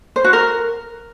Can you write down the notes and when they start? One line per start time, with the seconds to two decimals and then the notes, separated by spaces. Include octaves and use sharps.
0.16 C5
0.24 F#4
0.33 A#4